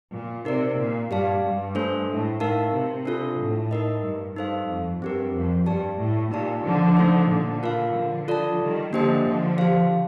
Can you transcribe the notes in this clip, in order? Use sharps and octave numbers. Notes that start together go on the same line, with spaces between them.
A#2
C3 D#4 A#4 D5
A#2
G2 G4 D5 F5 A5
G2
A3 D4 A4 C5
A2
A2 D#4 A#4 F5 A5
C3
D4 F4 A4
A2
D#4 A#4 D#5
G2
G2 D#4 A4 C5 F5
F2
G2 C4 G4 A#4
F2
G2 G4 D5 A5
A2
A#2 D#4 G4 D5 A5
D3 F3
A3 D#4 A4 C5
A#2 D3
F4 A#4 F5
D3 F3
F4 A4 D5 A5
D#3 G3
D3 F3 A#3 D4 G4 C5 D#5
D3 F3
G4 C5 F5